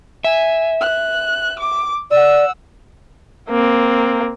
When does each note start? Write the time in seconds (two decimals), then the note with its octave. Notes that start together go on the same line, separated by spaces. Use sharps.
0.24 E5 G#5
0.81 F#6
1.59 D6
2.11 D5 F#5 E6
3.50 A#3 C4